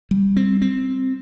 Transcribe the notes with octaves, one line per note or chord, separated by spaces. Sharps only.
G3
C4
C4